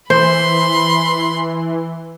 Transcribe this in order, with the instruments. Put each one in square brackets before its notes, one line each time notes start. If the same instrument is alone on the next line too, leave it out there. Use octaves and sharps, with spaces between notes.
[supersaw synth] E3 [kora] C5 [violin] B5 C6